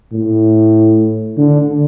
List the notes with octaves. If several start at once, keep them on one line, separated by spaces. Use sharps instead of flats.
A2
D3